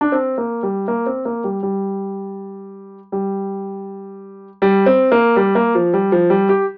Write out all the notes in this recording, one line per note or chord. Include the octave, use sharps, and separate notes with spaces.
D4
C4
A#3
G3
A#3
C4
A#3
G3
G3
G3
G3
C4
A#3
G3
A#3
F3
G3
F3
G3
G4